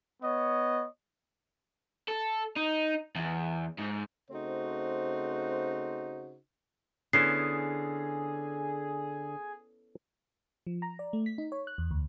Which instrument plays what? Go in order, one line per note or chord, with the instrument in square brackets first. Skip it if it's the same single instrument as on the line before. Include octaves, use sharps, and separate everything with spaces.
[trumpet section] B3 C#5 D#5
[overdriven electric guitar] A4
D#4
E2
G#2
[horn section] C#3 A3 C4 D#4 F#4 C5
[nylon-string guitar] D3 [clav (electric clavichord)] B3 C#4 E4 [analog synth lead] G#4 [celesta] C7
[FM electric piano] F3
A#5
D5
A3
B6
D#4
C#5
F#6
E2
D2